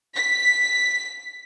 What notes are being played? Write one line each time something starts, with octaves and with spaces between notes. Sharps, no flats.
B6